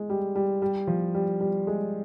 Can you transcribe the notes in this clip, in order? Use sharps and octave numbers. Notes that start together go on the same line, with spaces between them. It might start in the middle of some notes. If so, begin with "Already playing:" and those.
Already playing: G#3
G3
G3
G3
F3
G3
G3
G#3